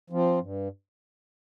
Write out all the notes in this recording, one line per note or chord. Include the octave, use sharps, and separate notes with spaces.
F3 C4
G2